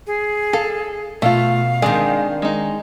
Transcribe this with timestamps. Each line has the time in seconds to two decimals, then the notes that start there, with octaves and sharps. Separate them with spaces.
0.07 G#4
0.53 A4 F5
1.22 B2 A3 F4 F5
1.82 D#3 G#3 C4 D4
2.42 G#3 D#4